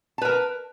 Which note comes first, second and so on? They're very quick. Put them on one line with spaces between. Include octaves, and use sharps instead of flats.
A5 B4 A#4